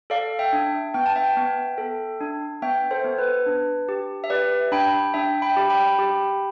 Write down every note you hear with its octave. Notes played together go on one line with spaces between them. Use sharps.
A4 D5 F5
E5 G5
D4
B3 G5
A5
E5 G5
B3
A4
D4
B3 E5 G5
A4 C5
B3
B4
D4
G4
E5
G4 B4 D5
D4 G5 B5
D4 E5 G5
G5 B5
G4
G5 B5
G4